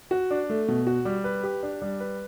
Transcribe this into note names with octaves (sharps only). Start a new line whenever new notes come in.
F#4
D4
A3
B2
F#4
G3
B4
G4
D4
G3
B4